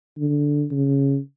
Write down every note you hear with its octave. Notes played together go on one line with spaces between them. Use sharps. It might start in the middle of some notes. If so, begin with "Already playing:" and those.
D3
C#3